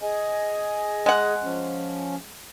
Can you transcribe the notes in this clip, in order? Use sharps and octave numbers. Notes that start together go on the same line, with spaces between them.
G#4 D#5 G#5
G#3 F#5
F3 C#4